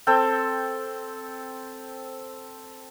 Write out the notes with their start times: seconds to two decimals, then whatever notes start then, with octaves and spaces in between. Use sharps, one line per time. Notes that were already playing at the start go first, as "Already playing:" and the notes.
0.07 C4 A4 G5